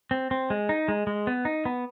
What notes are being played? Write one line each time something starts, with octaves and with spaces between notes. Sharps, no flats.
C4
C4
G#3
D#4
G#3
G#3
B3
D#4
B3